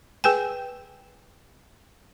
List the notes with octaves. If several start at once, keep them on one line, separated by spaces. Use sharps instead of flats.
G#4 B4 G5 G#5